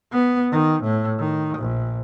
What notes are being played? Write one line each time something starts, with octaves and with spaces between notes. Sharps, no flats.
B3
D#3
A2
D#3
A#1